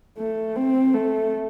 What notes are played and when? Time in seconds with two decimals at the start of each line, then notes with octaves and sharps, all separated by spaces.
0.18 A3
0.56 C4
0.94 A3